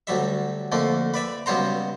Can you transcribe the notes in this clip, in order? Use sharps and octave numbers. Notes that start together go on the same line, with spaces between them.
D2 F#3 G3 E5
F2 D3 A3 A#3
B4 D5 E5
C#2 F#3 G3 B3 C5 A#5